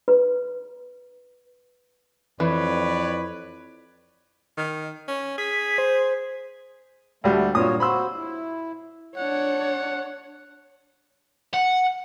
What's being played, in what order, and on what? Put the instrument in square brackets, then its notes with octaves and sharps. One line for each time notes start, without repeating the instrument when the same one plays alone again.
[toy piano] B4
[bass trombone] F2 [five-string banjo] E3 [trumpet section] B4 C#5 D5
[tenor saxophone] D#3
C#4
[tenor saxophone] G#4 [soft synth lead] B6
[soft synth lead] C5
[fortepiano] D2 G3 F#5 [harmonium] A3
[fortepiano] G2 A#2 D#6 [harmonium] F4 F#4 C#5
[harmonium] F#4 C5 [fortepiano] B5 C6 E6
[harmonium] E4
[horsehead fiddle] D4 C#5 [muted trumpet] F#5
[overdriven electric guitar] F#5